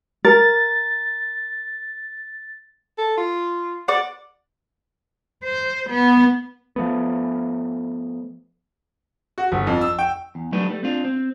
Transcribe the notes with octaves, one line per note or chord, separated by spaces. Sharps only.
A#4 A6
A4
F4
D5 F#5
C5
B3
F3 A3 B3
F#4
G1
F2
E6
G5
E2
F#3 G3 A3 D4 D#4 B4
G3 A3
C4 D4 F4
C4